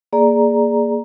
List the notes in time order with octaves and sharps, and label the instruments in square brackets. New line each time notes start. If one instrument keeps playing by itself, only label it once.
[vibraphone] A#3 G#4 D5 A#5